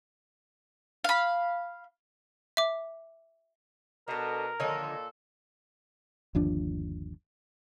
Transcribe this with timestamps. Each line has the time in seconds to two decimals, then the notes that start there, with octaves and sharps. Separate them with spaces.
1.04 F5 B5
2.57 E5 D6
4.08 B2 D4 A4 A#4
4.60 A#2 D3 D#3 F3 A4 C#5 D#5
6.35 G1 D#2 F3 D4